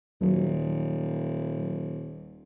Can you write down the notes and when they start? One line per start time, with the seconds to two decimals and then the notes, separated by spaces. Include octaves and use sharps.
0.21 D#1 D#2 F#3